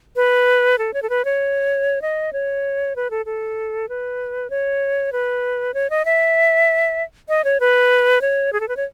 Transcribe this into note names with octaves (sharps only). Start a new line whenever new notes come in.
B4
A4
C#5
A4
B4
C#5
D#5
C#5
B4
A4
A4
B4
C#5
B4
C#5
D#5
E5
D#5
C#5
B4
C#5
G#4
A4
B4
C#5